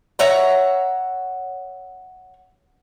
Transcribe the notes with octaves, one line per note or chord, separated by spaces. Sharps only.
C#5 E5 F#5 A#5